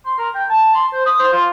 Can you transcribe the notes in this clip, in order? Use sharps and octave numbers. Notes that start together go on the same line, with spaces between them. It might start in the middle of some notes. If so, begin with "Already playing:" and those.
C6
A#4
G5
A5
C6
C5
D#6
C5
F4